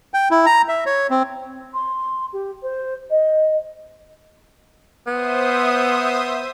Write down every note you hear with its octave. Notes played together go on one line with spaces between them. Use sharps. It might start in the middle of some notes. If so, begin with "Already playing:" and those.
G5
E4
A#5
E5
C#5
C4
C6
G4
C5
D#5
B3 C5 E5 D#6